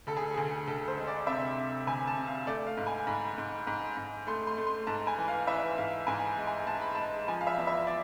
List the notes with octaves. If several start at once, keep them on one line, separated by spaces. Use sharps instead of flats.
D2 A4
G#4
D2 G#4
D2 A4
C5
G#3
D5
C3 E5
C3
D2 G#5
A5
C3
F5
A3 D5
F5
G#2
G#5
G#2 B5
G#2
G#2
G#2
A3 C6
C6
A3
C6
G#2 A5
G#5
E3
F5
E3 E5
G#2 F5
G#2 G#5
G#3
G#5
G#3 A5
B5
G#3 A5
F3 G#5
F5
E5
E2
E5
D5